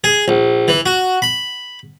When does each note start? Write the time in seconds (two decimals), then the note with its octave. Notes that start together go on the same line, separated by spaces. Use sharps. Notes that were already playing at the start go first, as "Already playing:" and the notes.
0.04 G#4
0.28 A#1
0.68 E3
0.86 F#4
1.22 B5